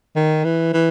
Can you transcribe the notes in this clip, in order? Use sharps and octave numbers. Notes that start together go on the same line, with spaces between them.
D#3
E3
E3